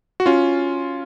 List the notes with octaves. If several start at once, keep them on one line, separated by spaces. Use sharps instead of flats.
F#4
C#4 F4